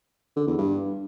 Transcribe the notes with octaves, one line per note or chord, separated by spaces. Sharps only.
D3
E2
G2